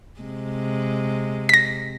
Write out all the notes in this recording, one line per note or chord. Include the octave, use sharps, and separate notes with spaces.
C3 G#3
A#6 B6